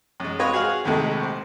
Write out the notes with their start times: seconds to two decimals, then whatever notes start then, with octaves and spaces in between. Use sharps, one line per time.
0.20 F#2 G#3
0.39 G#3 C4 F4 B4 C#5 D#5
0.52 F#4 G#4 C#5 F5
0.85 A#1 D#2 C3 G#3 A3
1.23 C5